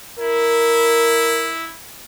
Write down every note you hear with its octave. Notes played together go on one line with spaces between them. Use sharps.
E4 A#4